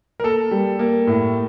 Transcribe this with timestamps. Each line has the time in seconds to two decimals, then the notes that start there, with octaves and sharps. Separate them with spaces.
0.20 A#4
0.23 A#3 A4
0.51 G3
0.79 A#3
1.07 A2